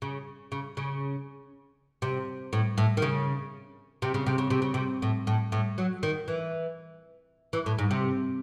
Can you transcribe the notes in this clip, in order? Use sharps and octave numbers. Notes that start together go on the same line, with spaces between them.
C#3
C#3
C#3
C3
A2
A2
D#3
C#3
C3
C#3
C3
C#3
C3
C#3
C3
A2
A2
A2
F#3
D#3
E3
E3
A2
G#2
C3